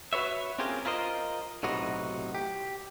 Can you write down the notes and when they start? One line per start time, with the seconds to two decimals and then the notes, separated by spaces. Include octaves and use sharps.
0.13 F#4 B4 C#5 E5
0.59 C4 C#4 F4 G4 G#4 A#4
0.85 E4 F4 A#4 C5 D#5
1.63 B1 A2 C3 D#4 F#4 B4
2.35 G4